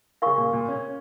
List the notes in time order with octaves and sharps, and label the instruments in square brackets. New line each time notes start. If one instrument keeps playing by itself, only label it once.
[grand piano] C#3 [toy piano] A#4 F5 G#5 C#6
[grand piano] A#2
A#2
C#4